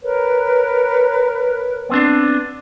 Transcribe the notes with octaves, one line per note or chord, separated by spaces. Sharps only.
A#4 B4 C#5
B3 C4 D4